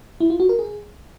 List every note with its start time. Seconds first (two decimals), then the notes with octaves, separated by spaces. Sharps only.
0.20 E4
0.30 F4
0.40 F#4
0.49 A#4
0.59 G#4